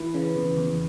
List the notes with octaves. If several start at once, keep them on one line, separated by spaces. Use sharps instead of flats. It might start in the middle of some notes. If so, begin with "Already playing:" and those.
Already playing: E3 B4
C#3
E2
E2